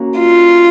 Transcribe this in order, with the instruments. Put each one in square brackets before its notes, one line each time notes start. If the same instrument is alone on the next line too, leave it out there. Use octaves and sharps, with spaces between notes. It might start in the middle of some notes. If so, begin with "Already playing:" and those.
Already playing: [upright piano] A#3 C#4 F#4
[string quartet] F4